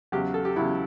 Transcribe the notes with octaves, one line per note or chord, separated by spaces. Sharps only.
E2 C#3 F#3 G4
A4
G4
E2 C#3 F#3 E4